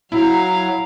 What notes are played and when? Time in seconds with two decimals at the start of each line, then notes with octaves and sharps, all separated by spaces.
0.12 F#3 E4 F5 A#5